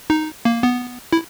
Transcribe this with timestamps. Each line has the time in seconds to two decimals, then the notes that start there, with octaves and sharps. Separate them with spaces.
0.10 D#4
0.45 A#3
0.63 B3
1.13 E4